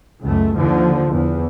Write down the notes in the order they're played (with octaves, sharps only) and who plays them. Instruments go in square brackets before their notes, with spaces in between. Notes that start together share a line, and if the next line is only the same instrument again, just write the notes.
[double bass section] C#2 F#2 A3
D#2 D3 F3
E2